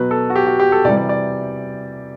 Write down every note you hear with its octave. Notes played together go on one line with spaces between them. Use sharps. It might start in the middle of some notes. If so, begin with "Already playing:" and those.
Already playing: B2 F#3 B4
A4
F#4
G4
F#4
G4
A4
C3 E3 G3 D5
D5
D5